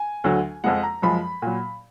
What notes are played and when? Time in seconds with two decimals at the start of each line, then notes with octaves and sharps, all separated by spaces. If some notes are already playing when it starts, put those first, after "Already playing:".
Already playing: G#5
0.24 D2 D3 F#3
0.64 F2 F3 G#3 F#5
0.83 A#5
1.02 F#2 F3 G#3 B5
1.42 A#2 F#3